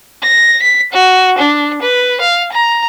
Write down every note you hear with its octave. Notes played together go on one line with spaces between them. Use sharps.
A#6
B6
F#4
D4
B4
F5
A#5